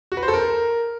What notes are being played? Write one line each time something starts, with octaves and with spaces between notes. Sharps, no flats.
F#4
B4
C5
A4
A#4